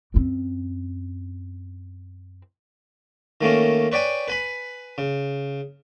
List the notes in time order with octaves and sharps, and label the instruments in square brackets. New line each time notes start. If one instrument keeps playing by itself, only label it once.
[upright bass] F#2 C4
[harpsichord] D#3 A3 A#3 C#4
B4 C#5 D5 G5 G#5
B4 G#5 B5
C#3